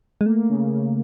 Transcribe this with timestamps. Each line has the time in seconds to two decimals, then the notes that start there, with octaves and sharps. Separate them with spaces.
0.21 G#3
0.26 A3 A#3
0.49 C#3
0.71 C#3